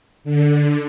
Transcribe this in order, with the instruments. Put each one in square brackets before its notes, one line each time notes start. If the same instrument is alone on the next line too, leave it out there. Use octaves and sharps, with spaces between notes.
[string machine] D3